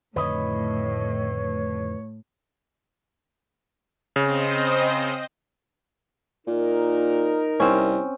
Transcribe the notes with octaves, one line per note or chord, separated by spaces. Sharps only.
F2 A2 D3 D#3 B4 C#5 D#5
C#3 C4 C5 D#5
A#2 D#4 A#4
C2 C4 C#4